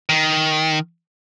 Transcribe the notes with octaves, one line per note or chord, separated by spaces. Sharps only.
D#3